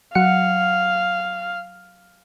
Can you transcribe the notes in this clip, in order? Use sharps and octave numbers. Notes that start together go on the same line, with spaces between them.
F#3 F5 F#5 C#7